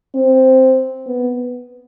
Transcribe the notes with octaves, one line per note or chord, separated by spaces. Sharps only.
C4
B3